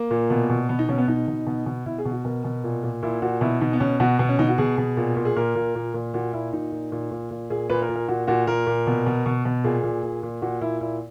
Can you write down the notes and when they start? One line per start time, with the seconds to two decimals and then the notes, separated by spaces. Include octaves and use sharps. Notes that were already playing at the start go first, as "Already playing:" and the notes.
Already playing: A#3
0.11 A#2
0.30 B2
0.49 B2
0.69 B2 B3
0.79 D#4
0.88 B2 C#4
0.98 B3
1.08 B2 D#4
1.27 B2
1.46 B2
1.66 B2
1.86 B2 E4
1.98 G#4
2.05 B2
2.12 F#4
2.25 B2 A#4
2.44 B2
2.64 A#2
2.83 A#2
3.03 A#2 E4
3.22 A#2 F#4
3.41 B2 E4
3.61 B2 D#4
3.73 B3
3.80 B2 C#4
4.00 B2 F#4
4.19 B2 B3
4.29 C#4
4.39 B2 D#4
4.49 F#4
4.58 B2 G#4
4.78 B2
4.97 A#2
5.17 A#2
5.25 G#4
5.36 A#2 A#4
5.56 A#2
5.75 A#2
5.94 A#2
6.14 A#2 F#4
6.33 A#2 E4
6.53 A#2 D#4
6.72 A#2
6.92 A#2
7.11 A#2
7.31 A#2
7.50 A#2 G#4
7.70 A#2 B4
7.82 A#4
7.89 A#2
7.95 A#4
8.08 A#2 F#4
8.27 A#2 F#4
8.47 A#2 A#4
8.67 A#2
8.87 B2
9.06 B2
9.26 B2
9.45 B2
9.64 A#2 G#4
9.84 A#2
10.03 A#2
10.23 A#2
10.42 A#2 F#4
10.61 A#2 E4
10.81 A#2 E4